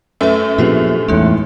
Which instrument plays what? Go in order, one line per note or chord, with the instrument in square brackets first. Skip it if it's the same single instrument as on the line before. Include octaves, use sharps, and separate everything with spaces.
[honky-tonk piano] F#2 A3 [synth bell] B4 E5
[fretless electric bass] A#2 F3 B3 [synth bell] D4 G4 G#4
[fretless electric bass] A1 E2 [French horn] A2 [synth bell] G#3 D#4